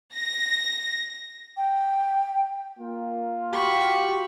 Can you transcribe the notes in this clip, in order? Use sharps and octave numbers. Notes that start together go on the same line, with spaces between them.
A#6
G5
A#3 F4
F#4 G4 B5 C#6